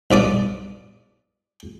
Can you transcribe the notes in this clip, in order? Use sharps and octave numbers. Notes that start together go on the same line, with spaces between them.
B1 G2 D5 D#6